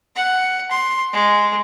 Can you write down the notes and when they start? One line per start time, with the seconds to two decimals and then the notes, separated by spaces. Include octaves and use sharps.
0.16 F#5
0.71 C6
1.13 G#3